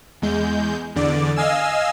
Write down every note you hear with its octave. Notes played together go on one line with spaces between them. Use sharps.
E2 G#3 G6
E2 D3 D5
D#5 F5 G#5 E6